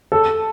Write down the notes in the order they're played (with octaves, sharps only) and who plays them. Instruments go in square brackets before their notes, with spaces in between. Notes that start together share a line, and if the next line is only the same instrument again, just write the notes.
[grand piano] A4